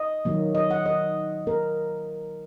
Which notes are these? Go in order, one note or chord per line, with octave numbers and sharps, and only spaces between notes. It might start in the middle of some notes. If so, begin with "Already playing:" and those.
Already playing: D#5
D#3 F#3 A#3
D#5
F#5
D#5
A#3 A#4